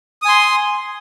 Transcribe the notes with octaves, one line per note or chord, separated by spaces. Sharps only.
G#5 C6 D#6